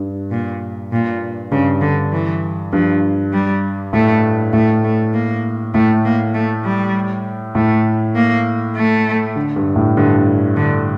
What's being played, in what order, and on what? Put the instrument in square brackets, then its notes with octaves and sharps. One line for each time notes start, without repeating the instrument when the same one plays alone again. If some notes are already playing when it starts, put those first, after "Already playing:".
Already playing: [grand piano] G2
[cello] A#2
A#2
[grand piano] G2 [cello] C#3
[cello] D3
E3
[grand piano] G2 [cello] F3
[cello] G3
[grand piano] A2 [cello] A3
[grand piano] A2 [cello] A3
[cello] A3
A#3
[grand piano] A2 [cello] A3
[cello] A#3
A3
G3
[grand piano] A2 [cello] A3
[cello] A#3
A3
[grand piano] D3
G2
A2
[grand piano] G2 [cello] D3
[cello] D3